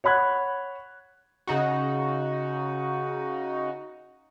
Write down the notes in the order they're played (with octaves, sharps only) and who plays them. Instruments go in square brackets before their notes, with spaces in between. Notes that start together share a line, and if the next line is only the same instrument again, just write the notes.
[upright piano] C#5 F#5 B5 F#6 G#6
[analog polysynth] C#3 D#4 F#4